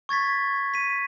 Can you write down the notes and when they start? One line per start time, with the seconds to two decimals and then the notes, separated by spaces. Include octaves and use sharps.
0.09 C#6 G#6 A6 B6
0.74 B6 D#7